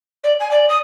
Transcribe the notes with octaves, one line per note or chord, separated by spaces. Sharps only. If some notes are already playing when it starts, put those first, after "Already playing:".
D5
G#5
D5
D#6